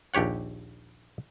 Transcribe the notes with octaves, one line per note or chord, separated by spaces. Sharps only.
A#1 D#2 G4 C#5 F#5